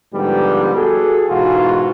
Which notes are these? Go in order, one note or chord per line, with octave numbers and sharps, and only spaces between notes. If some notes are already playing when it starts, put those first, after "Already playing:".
G#2 D3 F3 G3 B3 G4
F#4 G#4 A4
G#2 B2 E3 F4 F#4